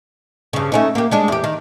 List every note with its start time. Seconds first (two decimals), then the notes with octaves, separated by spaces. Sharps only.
0.53 G2 C#3
0.72 A3 C#4 D#4
0.95 A#3 G4
1.11 G3 G#3 D4
1.28 E2 G4
1.44 D#3